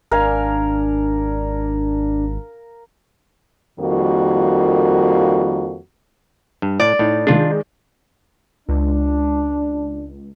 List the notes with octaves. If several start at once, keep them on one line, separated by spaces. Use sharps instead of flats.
G#1 D4 A#4 F5 G#5
F2 D#3 G3 A#3 F4 F#4
G2
A2 D5
A2 D#4
D#3 G#3 D4 F4
C#2 D4